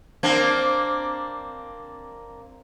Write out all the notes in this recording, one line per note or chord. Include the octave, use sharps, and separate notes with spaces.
A#3 C4 D4